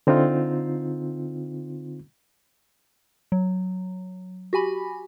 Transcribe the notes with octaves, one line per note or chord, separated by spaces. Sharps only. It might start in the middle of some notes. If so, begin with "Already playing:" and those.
D3 C4 D#4 F4
F#3
F#4 G4 G#5 B5